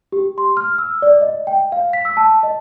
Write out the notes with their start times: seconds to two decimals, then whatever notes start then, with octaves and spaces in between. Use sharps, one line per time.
0.12 G4
0.38 C6
0.57 F6
0.78 E6
1.02 D5
1.22 D#5
1.47 G5
1.72 F5
1.93 B6
2.05 E6
2.17 A5
2.43 D#5